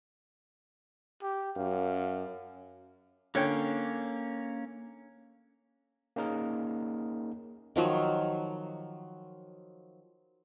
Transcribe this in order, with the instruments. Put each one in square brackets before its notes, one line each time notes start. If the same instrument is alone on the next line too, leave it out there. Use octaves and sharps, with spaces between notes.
[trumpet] G4
[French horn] F#2 [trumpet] F5
[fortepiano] D3 C#5 G5 [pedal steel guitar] A#3 C#4
[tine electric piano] A#3 C#4 D#4 G#4 A#4
[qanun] D#3 F3 F#3